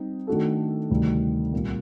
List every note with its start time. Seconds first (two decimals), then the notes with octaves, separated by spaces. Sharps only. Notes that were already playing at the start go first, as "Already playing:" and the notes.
Already playing: G3 C4 D#4
0.27 D#3 A3 D4 F#4 A4
0.90 D2 C3 D#3 G3 C4
1.53 C2 A#2 G3 A#3